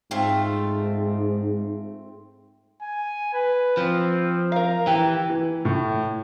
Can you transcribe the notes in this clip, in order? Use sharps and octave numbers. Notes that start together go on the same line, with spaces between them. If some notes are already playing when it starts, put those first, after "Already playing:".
G#2 A3 C4 F4
G#5
B4
F3 C4
A#4 F5 A#5
E3 G4
E3
A2